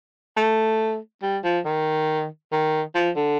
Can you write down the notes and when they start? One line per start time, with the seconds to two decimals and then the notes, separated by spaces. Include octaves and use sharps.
0.37 A3
1.23 G3
1.44 F3
1.66 D#3
2.52 D#3
2.95 F3
3.16 D3